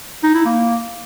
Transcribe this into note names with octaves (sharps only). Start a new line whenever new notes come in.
D#4
E4
A#3